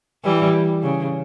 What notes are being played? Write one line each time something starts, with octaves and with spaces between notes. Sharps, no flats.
E3 G3
C#3